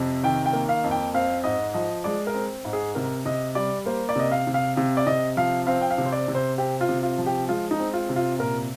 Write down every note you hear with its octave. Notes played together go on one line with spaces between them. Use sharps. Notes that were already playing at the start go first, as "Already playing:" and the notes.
Already playing: F2 C3
D#3 G5
G5
A#3
F5
F2
G5
C4 F5
G#2 D#5
F3 D#5
G#3 D5
A#4
C4
G#2
G#4
C3 A#4
C3 D#5
G3 D5
A#3 C5
D5
C3 D#5
F5
C3
F5
C3 F5
D5
C3 D#5
F3 F5
C4 F5
G5
F5
C3
C5
D5
C3
C5
C4 G4
F4
C3
F4
F3
G4
G#3 F4
D#4
C4
F4
C3
F4
A#2 A#4